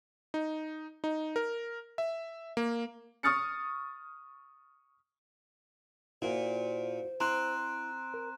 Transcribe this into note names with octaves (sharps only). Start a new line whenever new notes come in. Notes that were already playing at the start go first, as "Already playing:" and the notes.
D#4
D#4
A#4
E5
A#3
C#6 D#6 F6 A6 C#7
A#2 E4 F#4 C5
C4 E4 A#5 C6 F#6
A#4